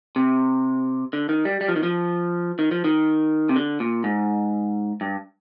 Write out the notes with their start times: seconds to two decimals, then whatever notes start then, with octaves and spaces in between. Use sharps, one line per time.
0.16 C3
1.13 D3
1.29 D#3
1.45 G3
1.61 G3
1.68 F3
1.76 D#3
1.83 F3
2.59 D#3
2.71 F3
2.84 D#3
3.49 C3
3.56 D3
3.80 A#2
4.04 G#2
5.01 G2